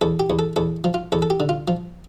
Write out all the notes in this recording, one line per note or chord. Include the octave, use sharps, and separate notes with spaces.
E2 A4
G4
E2
A4
E2 A4
F3
F4
E2 A4
A4
G4
D3
F4
F3